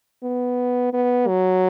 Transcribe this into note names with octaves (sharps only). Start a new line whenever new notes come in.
B3
B3
F#3